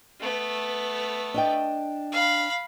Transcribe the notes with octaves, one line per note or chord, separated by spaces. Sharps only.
A3 B3
D4 D#5 G5
F5 B5